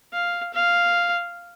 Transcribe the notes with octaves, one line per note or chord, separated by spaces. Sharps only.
F5
F5